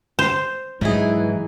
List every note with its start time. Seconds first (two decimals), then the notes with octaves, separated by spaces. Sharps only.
0.19 C5
0.81 G#2 E3 F#3 D#4 E4 G#4